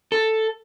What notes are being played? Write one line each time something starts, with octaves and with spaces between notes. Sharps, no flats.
A4